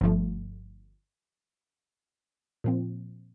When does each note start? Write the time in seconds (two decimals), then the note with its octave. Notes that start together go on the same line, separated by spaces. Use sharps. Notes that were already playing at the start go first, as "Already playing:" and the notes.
0.01 G1 G2 F3 A3
2.64 A#2 F3 C4